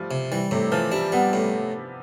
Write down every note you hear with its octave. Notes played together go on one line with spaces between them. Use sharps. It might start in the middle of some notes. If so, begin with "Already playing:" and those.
Already playing: F3 G3 A3
C3
E3 G3
A2 C3
E3 F3
G3 D4
G3 B3
A2